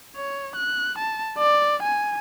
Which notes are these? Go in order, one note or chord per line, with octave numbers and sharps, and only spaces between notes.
C#5
F#6
A5
D5
G#5